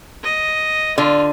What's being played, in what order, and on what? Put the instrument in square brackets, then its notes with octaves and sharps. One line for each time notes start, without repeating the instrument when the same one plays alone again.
[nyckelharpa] D#5
[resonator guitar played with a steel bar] D3 [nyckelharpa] F4